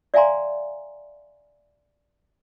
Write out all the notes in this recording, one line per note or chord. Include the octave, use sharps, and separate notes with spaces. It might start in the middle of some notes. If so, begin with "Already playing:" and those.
D5 E5 F5 G#5 A#5 C6